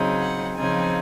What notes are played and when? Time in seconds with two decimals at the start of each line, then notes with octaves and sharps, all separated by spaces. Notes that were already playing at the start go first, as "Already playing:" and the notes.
Already playing: C#3 F#3 C4 D#4
0.21 F#5
0.57 C#3 F3 C4 D#4 G#5